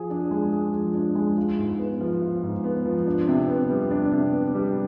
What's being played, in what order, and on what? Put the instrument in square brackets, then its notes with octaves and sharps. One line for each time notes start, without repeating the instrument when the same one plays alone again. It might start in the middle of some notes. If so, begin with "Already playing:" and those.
Already playing: [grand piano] F3 G#4
D4
G#3
G#4
F3
D4
G#3
F4
G#2
B3
F3
F4
G#2
B3
F3
D4
C3
B3
G3
D4
C3
B3
G3